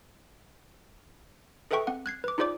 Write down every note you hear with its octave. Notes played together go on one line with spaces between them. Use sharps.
G#4 A4 B4 E5 G5 C#6
C4 F#5
F#6 G#6 C7
B4 D6
D#4 F4 G#4 C5 D5 D6